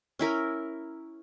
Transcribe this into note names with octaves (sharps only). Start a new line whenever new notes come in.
C#4 E4 A#4 B5